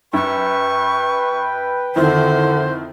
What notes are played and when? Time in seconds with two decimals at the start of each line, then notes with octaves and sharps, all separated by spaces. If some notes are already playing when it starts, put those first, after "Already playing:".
0.13 F#2 B4 G5 C#6
1.96 F2 D3 D#3 E4 C5